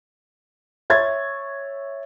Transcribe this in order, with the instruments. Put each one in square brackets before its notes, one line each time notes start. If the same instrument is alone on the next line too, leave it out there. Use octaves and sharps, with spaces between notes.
[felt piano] C#5 E5 G#6 A6